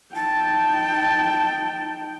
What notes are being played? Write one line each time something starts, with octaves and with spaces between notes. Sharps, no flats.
D#4 G5 A5